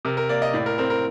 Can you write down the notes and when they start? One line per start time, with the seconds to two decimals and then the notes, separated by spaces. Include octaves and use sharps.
0.05 C3 A#4
0.17 A#4
0.29 A#3 D5
0.42 D#5
0.53 A2 D5
0.66 A#4
0.78 C4 A#4
0.90 A#4